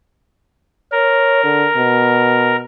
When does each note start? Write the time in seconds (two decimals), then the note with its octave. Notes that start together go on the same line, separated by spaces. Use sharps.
0.92 A#4 C#5
1.44 D3
1.76 B2